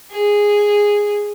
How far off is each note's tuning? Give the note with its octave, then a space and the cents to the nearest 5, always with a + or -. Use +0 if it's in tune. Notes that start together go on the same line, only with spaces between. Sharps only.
G#4 -5